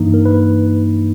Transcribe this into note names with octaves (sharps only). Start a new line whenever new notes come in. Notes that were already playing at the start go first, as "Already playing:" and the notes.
Already playing: G2 E3 A#3 D#4
A#4
B4